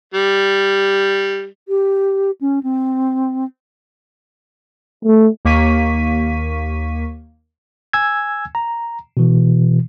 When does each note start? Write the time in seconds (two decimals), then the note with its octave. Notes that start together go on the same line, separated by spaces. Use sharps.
0.14 G3
1.68 G4
2.41 C#4
2.63 C4
5.05 A3
5.45 D#2 A#3 C#6 B6 D#7
7.93 G#5 E6 G#6
8.55 A#5
9.17 B2 E3